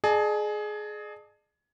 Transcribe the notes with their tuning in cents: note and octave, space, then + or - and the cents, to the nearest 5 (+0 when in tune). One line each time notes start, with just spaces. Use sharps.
G#4 +20 D5 +45 A5 +0